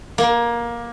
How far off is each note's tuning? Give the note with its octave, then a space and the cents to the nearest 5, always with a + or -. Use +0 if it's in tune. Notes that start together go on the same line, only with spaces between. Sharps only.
A#3 +20